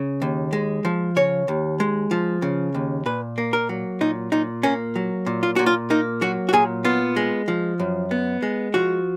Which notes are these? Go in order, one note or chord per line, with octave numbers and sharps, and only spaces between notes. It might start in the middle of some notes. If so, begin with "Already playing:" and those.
Already playing: C#3
D#2
G#3
F3
C#3 C#5
D#2
G#3
F3
C#3
D#2
A#2 B4
A#3
A#4
F#3
A#2 D#4
A#2 D#4
A#3 C#4
F#3
A#2
F4
A#2 F#4
F4
A#3 D#4
F#3 F#4
F#4
A#2 G#4
B3 F4
G#3
F3
F#2
B3
G#3
F3 F#4